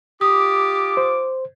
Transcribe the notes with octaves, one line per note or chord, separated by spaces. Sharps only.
F4 G4 D6 D#6
C5